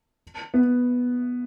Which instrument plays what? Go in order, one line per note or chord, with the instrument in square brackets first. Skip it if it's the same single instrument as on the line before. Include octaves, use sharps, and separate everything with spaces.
[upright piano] B3